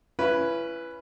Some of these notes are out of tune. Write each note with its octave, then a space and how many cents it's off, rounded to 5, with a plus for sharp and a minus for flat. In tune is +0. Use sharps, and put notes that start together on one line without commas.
C#4 +0 E4 +35 B4 +0